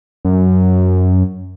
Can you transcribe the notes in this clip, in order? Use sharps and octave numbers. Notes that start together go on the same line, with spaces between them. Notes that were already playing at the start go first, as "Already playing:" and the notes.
F#2